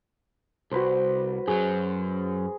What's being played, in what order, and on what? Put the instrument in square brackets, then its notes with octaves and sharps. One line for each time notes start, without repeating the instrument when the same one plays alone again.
[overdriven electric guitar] C2 [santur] F#4 B4 C5
[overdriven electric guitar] F#2 F#3 [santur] G#4